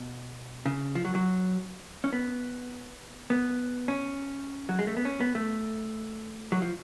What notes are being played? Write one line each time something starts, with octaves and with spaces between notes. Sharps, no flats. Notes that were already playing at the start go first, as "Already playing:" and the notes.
Already playing: B2
C#3
F3
F#3
F#3
C#4
B3
B3
C#4
F#3
G#3
A3
B3
C#4
B3
A3
F#3
F3